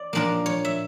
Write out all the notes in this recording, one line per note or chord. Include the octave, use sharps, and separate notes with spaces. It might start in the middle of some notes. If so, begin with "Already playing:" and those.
Already playing: D5
A#2 F3 A#3 D4 A#4
C#5
E5